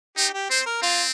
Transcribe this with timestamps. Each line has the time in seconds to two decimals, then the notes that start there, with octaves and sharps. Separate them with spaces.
0.17 D#4 G4
0.34 G4
0.50 C4 C5
0.66 A#4
0.82 C4 F4